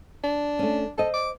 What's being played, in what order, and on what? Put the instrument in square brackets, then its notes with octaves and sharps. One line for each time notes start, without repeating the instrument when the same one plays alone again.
[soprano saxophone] D4
[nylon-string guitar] A3 C#4
[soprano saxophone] A4 [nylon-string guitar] C5 D#5
[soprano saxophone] D6